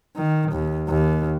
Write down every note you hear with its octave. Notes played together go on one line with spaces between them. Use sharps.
D#3
D#2
D#2